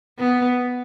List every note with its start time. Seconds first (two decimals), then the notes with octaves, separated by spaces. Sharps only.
0.19 B3